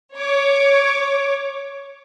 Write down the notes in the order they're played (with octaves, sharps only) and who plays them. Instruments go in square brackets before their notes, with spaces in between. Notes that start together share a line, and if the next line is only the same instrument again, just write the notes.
[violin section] C#5 D6